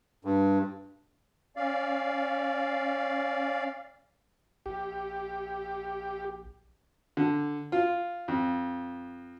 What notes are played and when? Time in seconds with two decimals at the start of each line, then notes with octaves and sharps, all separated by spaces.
0.25 G2
1.56 C#4 D5 F5
4.66 A#1 G4
7.17 D3
7.72 F4
8.28 F2